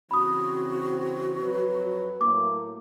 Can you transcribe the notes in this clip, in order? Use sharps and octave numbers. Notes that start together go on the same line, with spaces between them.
C#3 E3 C4 F#4 B5 D#6
F2 F#3 B4
A2 F#3 A#3 D6